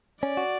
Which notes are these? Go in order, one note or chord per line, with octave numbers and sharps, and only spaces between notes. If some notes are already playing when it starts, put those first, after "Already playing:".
C#4 D5
F#4